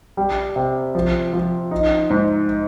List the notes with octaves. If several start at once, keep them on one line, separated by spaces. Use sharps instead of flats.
G3
C3
F3
F3
D#4
G#2